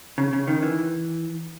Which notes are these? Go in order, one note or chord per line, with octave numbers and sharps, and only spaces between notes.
C#3
C#3
D#3
E3